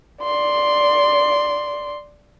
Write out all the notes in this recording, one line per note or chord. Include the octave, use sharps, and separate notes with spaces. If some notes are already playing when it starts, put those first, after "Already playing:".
D5 C6